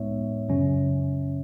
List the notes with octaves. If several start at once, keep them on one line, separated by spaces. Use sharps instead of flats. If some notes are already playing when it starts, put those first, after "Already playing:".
Already playing: A2 G#3 B3 D#4 C#5 E5
F#2 C#3 F#3 C#4